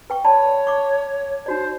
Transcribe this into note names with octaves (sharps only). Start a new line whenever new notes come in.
B4 G5 C#6
C#5 D5 A5 B5
C#6 D6
D#4 F#4 C5 D5